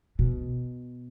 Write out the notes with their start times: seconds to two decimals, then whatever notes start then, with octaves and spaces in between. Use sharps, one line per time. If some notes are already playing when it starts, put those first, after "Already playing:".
0.19 B2